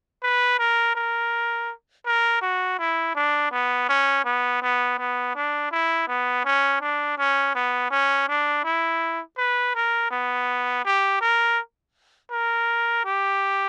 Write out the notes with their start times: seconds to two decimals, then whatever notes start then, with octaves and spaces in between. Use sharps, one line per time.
0.23 B4
0.59 A#4
0.95 A#4
2.06 A#4
2.42 F#4
2.79 E4
3.16 D4
3.52 B3
3.89 C#4
4.25 B3
4.62 B3
4.99 B3
5.36 D4
5.72 E4
6.08 B3
6.45 C#4
6.81 D4
7.18 C#4
7.55 B3
7.91 C#4
8.28 D4
8.64 E4
9.38 B4
9.75 A#4
10.11 B3
10.85 G4
11.21 A#4
12.31 A#4
13.05 G4